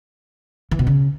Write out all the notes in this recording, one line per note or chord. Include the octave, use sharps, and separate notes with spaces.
E3
B2
C#3